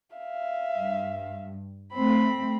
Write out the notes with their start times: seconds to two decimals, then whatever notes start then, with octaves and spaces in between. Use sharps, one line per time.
0.16 E5 F5
0.78 G2
1.94 A3 C4 B5